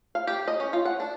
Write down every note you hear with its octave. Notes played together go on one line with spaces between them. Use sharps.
F5
G4
D#5
C#4
F4
F#5
D4